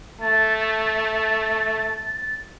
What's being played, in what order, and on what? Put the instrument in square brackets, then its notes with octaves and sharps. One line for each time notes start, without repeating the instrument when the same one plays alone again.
[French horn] A3 [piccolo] A6